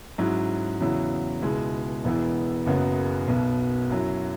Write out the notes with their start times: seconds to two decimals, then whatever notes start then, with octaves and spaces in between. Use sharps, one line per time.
0.18 G#2 F#3 C#4 E4
0.80 E2 C#3 F#3 E4
1.42 C#2 B2 G#3 E4
2.04 E1 E2 E3 B3 E4
2.66 F#1 F#2 C#3 F#3 B3
3.28 B1 B2 B3
3.90 F#2 F#3 E4